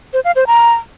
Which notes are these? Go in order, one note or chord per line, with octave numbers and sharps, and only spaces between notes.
C5
F5
C5
A#5